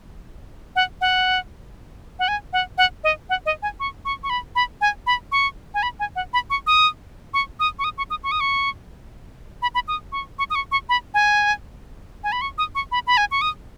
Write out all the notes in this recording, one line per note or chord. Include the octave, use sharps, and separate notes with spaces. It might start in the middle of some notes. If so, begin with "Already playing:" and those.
F#5
F#5
F#5
G#5
F#5
F#5
D#5
F#5
D#5
G#5
C#6
C#6
C#6
B5
B5
G#5
B5
C#6
G#5
B5
G#5
F#5
B5
C#6
D#6
C#6
D#6
C#6
D#6
C#6
D#6
C#6
D#6
C#6
B5
B5
D#6
C#6
C#6
D#6
C#6
C#6
B5
G#5
G#5
B5
C#6
D#6
C#6
B5
B5
G#5
C#6
D#6